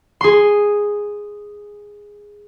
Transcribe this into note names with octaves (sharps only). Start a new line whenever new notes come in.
G#4 C6